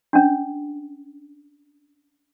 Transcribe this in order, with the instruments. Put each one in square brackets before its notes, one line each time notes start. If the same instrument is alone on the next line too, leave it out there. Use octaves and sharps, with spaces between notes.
[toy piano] C#4 D4